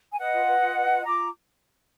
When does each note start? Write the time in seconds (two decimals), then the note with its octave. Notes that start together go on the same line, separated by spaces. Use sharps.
0.12 G#5
0.18 B4 D#5 F#5
0.33 F4
0.47 B4
0.62 F4
0.76 B4
0.90 F4
1.05 F4 A#5 D6